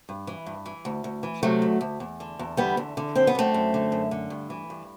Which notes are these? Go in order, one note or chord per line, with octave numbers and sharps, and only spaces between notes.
G2
E3
G2
E3
D2
D2
E3
C3 F#3 A3
D2
D2
E2
D3
E2
D3 G3 B3
E2
D3
F#2 C4
B3
D3 A3 C4
F#2
D3
F#2
D3
G2
E3
G2